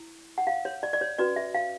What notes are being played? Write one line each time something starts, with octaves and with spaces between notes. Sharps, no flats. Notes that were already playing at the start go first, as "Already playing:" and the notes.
Already playing: E4
F#5
F5
C#5
D5
D5
C#5
C#4 F#4 B4 D5
E5
F5